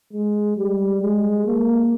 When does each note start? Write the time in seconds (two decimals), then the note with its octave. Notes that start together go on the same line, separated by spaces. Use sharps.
0.13 G#3
0.57 G3
1.03 G#3
1.46 A#3